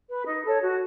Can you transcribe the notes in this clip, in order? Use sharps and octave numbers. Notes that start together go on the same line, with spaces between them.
B4
D#4
A4 C#5
F#4